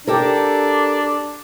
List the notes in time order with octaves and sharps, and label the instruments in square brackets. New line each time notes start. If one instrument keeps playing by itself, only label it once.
[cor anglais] D4 [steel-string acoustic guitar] G4 A4 A#4